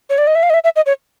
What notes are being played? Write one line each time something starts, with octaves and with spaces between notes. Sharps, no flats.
C#5
D5
D#5
E5
F5
D#5
E5
E5
D#5
C#5